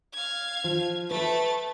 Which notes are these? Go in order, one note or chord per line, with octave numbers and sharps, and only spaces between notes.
F5 G#6
F3
A3 B4 A6